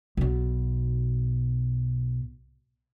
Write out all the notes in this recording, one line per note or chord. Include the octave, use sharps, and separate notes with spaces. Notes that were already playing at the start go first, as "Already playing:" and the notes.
B1 B2